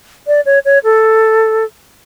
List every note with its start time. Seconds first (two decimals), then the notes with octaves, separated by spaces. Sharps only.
0.27 D5
0.46 C#5
0.65 C#5
0.84 A4